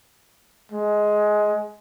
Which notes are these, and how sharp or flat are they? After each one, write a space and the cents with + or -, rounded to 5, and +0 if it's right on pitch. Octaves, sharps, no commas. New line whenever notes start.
G#3 +15